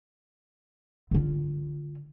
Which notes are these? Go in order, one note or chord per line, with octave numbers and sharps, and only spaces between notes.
D3 F4